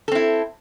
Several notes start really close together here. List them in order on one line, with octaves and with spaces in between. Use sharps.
A4 C4 E4